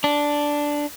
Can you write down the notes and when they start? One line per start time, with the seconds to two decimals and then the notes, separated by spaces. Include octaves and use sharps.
0.04 D4